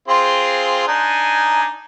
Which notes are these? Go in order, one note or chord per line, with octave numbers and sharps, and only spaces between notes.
C4 F4 G#4
D4 D#4 G#5